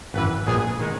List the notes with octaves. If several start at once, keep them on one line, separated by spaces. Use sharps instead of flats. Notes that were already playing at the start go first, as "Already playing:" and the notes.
G#1 F#2 E3 B4
A#1 A#2 G#3 B3 G#4
D#3 G#3 D#4